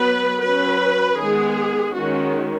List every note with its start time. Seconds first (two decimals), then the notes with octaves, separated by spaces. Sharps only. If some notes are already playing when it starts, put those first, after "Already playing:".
Already playing: F#3 B3 B4
0.42 F#3 C#4 B4
1.18 D#3 G#3 B3 G#4
1.93 D#3 G#3 C#4 F#4